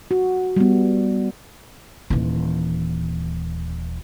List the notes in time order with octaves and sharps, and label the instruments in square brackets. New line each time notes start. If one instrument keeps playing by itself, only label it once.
[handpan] F#4
G3 B3
[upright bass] D#1 E3